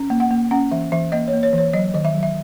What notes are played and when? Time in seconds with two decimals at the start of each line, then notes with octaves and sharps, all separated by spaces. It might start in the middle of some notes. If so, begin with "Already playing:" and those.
Already playing: C#4
0.10 A#3
0.20 F#5
0.31 A#3
0.51 C#4 F#5
0.72 E3 E5
0.92 E3 E5
1.12 A#3 D#5
1.28 C#5
1.33 A#3
1.43 C#5
1.53 E3 C#5
1.73 F#3 D#5
1.94 D#3 D#5
2.05 E5
2.15 F#3
2.23 E5